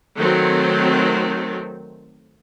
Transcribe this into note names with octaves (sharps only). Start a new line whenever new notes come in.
D#3 F#3 A3 C4